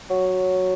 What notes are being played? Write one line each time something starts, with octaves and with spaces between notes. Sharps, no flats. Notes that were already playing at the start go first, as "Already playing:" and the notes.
F#3